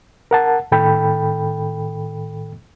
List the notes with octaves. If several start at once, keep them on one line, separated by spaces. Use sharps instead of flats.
A#4 F#5 A5
A2 D#3 A4 G5 B5